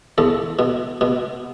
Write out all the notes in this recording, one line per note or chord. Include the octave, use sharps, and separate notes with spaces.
E2 A4
B2
B2